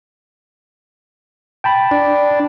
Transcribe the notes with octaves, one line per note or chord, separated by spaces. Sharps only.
G5 A5 B5
D4